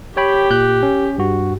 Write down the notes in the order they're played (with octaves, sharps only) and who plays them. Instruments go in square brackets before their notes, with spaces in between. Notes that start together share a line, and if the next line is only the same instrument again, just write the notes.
[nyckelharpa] G4 [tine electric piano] C#5 G5 B5
[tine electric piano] A#2 F#6 G6
C#4
G2 F#4